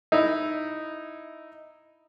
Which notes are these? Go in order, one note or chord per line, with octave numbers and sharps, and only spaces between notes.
D#4 E4